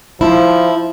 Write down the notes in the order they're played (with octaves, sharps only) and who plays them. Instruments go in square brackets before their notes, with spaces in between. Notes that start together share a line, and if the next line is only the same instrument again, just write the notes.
[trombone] F3 [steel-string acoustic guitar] E4